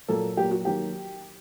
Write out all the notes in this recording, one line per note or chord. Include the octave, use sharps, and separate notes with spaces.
A#2 F#3 A#3 A4
A#2 F#3 A#3 G4
F#4
D#3 F#3 A#3 G4